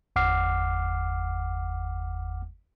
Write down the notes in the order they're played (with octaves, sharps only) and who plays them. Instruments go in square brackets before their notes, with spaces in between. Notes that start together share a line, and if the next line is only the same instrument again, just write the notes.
[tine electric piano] G1 E2 F#5 D6 F6 C7